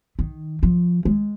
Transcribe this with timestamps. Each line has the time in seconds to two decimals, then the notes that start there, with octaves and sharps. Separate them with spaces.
0.19 D#3
0.63 F3
1.05 G#3